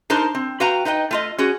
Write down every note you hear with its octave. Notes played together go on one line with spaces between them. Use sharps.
D4 D#4 A#4 C5 A5
C4
F#4 B4 F5 G5 A#5
D#4 B4 D#5 G5
A3 F4 D#5
C#4 F#4 G#4